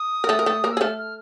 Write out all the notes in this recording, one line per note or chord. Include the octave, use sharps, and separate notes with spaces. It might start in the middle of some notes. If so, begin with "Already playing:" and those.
Already playing: D#6
A#4
A3 A4
A#4
A3 A4
A#3 A#4
E6
G#4
A3 A4 F6
F6